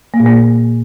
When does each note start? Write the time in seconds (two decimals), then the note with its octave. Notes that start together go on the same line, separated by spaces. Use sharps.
0.14 A#3
0.20 A#2
0.26 A#3